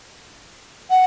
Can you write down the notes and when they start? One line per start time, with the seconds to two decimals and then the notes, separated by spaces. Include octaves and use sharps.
0.90 F#5